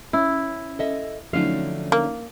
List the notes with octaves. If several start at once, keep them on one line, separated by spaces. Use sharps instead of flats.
C#4 E4
A4 D#5 E5
D3 F3 F#3 A3 C#4 D#4 F5
A#3